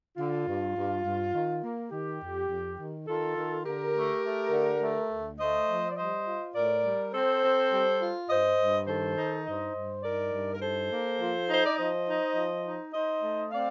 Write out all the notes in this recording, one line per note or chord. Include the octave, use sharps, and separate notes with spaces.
D3 F4
G2
G2
G2
D#3
A#3
D#3 G4
F2
F2
D#3
D#3 F4 A4
D#3
D3 G4 A#4
A3
A3
D3
A3
D2
A3 C5 D#5
F3
D5
G3 C5 D#5
F4
A2 A#4 D5
G3
C4 A4 C5
C4
G3
F4
G2 C5 D#5
G2
D#3 A4 C5
D#4
G2 C5 D#5
G2
D#4 A#4 D5
G2
A#4
D#4 A4 C5
A#3
F3
D#4 C5
D5
F3 C5 D#5
D#4
F3
D#4
D#4 C5 D#5
A3
C4 D5 F5